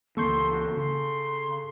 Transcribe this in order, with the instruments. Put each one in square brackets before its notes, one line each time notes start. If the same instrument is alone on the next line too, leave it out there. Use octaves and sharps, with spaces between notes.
[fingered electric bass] C#2 E3 A#3 [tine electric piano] A4 C#6 G6 [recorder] C6
[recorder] F#4
[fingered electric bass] C#3 [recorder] C6